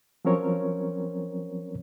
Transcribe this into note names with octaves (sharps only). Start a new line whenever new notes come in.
F3 F#3 C4 C#4 A#4 C#5